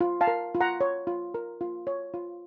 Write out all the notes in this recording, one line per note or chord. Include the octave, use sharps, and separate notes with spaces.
F4
F5 A5
A#4
F4
F#5 A#5
C#5
F4
A#4
F4
C#5
F4